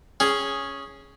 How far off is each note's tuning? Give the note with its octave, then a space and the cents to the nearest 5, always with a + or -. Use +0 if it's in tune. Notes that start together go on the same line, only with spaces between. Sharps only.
C#4 +0 G#4 +0